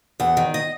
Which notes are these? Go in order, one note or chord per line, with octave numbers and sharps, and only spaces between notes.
E2 F#5
D#3
D#5